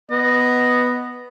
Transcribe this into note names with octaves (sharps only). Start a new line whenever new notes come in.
B3 D#5